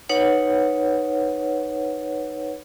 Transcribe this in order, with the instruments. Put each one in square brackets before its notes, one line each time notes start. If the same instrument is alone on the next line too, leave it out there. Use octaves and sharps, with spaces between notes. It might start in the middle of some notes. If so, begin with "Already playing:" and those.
[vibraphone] D#4 B4 C#5 F#5